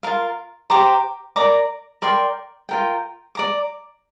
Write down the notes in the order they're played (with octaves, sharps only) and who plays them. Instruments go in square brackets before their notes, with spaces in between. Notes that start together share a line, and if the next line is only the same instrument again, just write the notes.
[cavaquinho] F4 A#4 F5
G4 C5 A#5 D6
A#4 D5 A#5 D6
A#4 D5 G5 C6
F4 A#4 G5
D5 A#5 D6